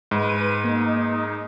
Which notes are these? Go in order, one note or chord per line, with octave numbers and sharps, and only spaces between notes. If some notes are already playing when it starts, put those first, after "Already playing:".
G#2 B4 D#7
A#3 D#4